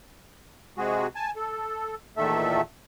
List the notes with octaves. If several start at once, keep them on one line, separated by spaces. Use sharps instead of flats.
C3 G#3 F#4 G#4
G#5 A5
A4
E2 A#2 D#3 A3 A4 E5